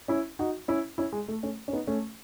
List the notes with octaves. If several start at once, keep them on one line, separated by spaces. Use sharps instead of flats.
C#4 E4
D#4 F#4
C#4 E4
C#4 E4
G#3
A3
A3 C#4
C#4
B3 D#4
A3 C#4